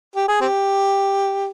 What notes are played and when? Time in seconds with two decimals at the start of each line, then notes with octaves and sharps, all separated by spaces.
0.15 G4
0.28 G#4
0.41 C4 G4